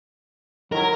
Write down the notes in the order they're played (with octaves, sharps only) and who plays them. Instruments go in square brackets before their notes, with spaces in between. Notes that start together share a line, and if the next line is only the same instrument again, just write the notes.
[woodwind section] D#3 E4 [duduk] F#3 [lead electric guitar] A#4